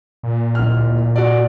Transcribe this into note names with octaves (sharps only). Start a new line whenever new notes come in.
A#2
D1 F6
F#4 D5